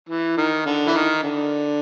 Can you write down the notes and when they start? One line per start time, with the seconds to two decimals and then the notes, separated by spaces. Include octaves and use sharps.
0.09 E3
0.37 D#3
0.66 D3
0.87 E3
0.94 D#3
1.23 D3